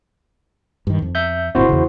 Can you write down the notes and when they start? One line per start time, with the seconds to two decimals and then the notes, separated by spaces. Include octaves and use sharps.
0.87 G2 D#3
1.02 F2
1.15 E5 G6
1.55 G1 A#2 C4 E4 F#4 C5
1.69 E2 C#3